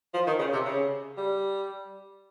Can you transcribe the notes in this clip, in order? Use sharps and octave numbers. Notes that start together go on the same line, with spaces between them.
F3
D#3
C#3
C3
C#3
G3